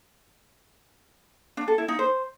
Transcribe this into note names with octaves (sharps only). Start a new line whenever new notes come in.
D4
A4
E4
D#4
C5